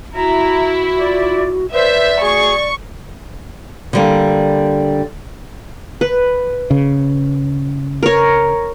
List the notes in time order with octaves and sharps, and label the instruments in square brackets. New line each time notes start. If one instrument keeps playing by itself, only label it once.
[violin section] E4 [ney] F#4 [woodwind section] A#5
[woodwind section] F4 D5
[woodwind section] B4 C5 [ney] D5 [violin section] E5
[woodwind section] A3 F#4 G#4 [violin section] C#6
[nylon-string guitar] D3 G3 A#3
[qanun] B4
[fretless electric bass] C#3
[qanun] A#4 C#5